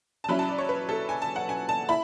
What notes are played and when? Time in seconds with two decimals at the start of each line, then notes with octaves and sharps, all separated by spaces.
0.24 A5
0.28 F#3 C#4 E4 B5
0.39 A5
0.49 D5
0.58 C#5
0.69 B4
0.89 A4
1.09 G#5
1.22 A5
1.36 F#5
1.49 G#5
1.69 A5
1.89 E4 B5